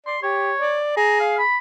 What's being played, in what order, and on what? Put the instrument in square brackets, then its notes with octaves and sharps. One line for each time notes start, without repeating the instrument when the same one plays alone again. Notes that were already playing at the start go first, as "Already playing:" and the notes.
[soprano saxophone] D5 [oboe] C6
[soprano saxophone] G4 [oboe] C#5
[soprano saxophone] D5
[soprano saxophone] G#4 [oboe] A#5
[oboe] F5
B5